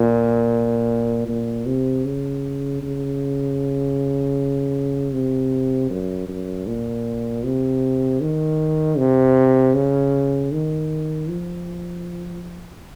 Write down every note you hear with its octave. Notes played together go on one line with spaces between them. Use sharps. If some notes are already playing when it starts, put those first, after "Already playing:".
Already playing: A#2
A#2
C3
C#3
C#3
C3
F#2
F#2
A#2
C3
D#3
C3
C#3
D#3
F3